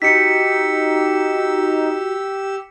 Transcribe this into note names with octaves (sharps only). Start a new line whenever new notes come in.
D#4 F#4 G4 E6 B6 C#7